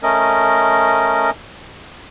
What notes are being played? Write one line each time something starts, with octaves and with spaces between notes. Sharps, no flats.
A3 C#4 A#4 D#5